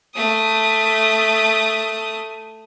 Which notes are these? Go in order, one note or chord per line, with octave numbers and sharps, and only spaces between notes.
A3 D#6